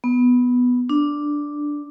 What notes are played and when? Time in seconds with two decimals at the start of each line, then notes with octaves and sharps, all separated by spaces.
0.04 B3
0.90 D4